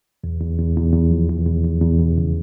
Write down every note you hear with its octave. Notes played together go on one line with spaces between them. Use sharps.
E2
E2
E2
E2
E2
F3
E2
E2
E2
E2
E2
C#3